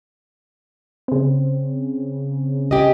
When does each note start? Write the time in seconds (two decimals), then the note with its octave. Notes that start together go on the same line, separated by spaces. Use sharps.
1.08 C#3 C4
2.71 G4 G#4 D#5